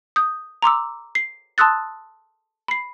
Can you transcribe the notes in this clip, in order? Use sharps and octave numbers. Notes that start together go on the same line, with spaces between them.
D#6 G6
A#5 C6 D6 E6
C7
A5 C6 D#6 E6 F#6 A6
B5 C7